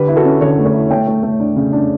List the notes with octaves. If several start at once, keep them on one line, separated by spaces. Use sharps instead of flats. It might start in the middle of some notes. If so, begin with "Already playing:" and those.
Already playing: D3 G4 B4
E4
F#4 A4
C#4
D3 A4 C#5
A3
A4 C#5
E4
A3 E5 G5
A3
A3
D4
C#3
D4